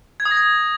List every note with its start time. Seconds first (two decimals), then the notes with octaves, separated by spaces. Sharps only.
0.20 G#6
0.25 D#6
0.31 A#6
0.37 G#6